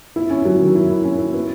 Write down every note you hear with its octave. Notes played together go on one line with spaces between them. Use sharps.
E4
C#4
F#3
D#3
E4
E4
C#4
E4
B3